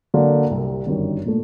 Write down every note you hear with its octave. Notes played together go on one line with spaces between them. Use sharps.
D3 F#3 A#3
C2 C3 G3
G1 F#2 D#3 G3
A#2 A3